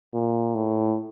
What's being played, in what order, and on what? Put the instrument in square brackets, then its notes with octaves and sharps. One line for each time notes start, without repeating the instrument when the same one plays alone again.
[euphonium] A#2
A2